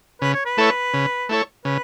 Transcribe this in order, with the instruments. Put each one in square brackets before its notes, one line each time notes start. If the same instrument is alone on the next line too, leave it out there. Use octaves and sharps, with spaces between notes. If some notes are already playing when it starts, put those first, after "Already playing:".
[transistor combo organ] C#3 [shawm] B4
[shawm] C#5
B4
[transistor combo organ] A3 E4 A4 C#5
C#3
A3 E4 A4 C#5
[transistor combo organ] C#3 [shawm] B4